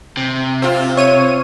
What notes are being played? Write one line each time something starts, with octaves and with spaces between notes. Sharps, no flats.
C3
C4 F4
C#5 D#7